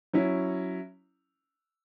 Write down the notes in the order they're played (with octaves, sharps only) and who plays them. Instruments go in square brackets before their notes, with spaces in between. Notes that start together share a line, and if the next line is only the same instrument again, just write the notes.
[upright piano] F#3 C#4 E4